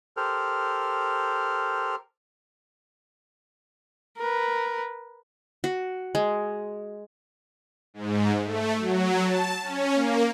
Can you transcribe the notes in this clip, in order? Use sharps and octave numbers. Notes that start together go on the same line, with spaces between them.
G4 A4 A#4 C5 F6
A#4 B4
F#4
G#3
G#2
A3
F#3
A5
C#4
A#3